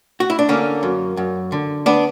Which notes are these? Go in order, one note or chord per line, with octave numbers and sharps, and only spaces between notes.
F#4
E4
D4
D3 A#3 C#4
F#2
F#2
D3
B3 D4